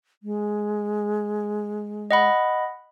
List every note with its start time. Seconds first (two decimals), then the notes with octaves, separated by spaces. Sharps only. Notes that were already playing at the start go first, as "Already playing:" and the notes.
0.23 G#3
2.11 D#5 F#5 B5